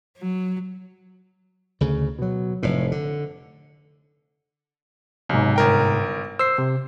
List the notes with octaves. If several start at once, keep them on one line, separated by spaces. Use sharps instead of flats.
F#3
D2 C#3
B2 F#3
F1 A2
D3
B1 G#2 C3
G1 A#4 G5
C5 E6 C7
C3